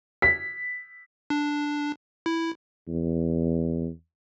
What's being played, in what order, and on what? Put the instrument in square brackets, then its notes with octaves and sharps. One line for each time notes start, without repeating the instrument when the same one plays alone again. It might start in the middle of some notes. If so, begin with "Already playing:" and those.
[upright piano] B6
[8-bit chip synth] D4
E4
[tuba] E2